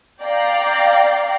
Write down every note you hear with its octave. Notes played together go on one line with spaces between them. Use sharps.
D5 F5 G5 A#5